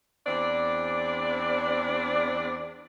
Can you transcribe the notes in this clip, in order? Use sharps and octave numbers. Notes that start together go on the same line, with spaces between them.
E2 C4 D4 D5